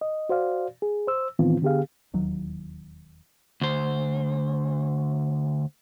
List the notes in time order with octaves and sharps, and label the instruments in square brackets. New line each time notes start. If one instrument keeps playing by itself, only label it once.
[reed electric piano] D#5
F#4 C5 D5 F5
G#4
C5 E6
A2 D#3 E3 B3 C4 F4
D3 B3 G4 G#4 F5
[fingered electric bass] E1 D#2 F#3
[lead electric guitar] D2 C5